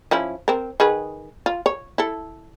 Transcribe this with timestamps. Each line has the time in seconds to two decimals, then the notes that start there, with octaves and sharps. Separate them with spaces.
0.11 F3 C#4 E4
0.48 C4 A#4
0.80 D#3 G#4 B4
1.46 F4
1.66 C#5
1.98 E4 A4